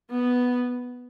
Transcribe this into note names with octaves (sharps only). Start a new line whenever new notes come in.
B3